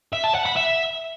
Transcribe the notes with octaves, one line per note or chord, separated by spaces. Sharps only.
E5
A5
F#5
B5
E5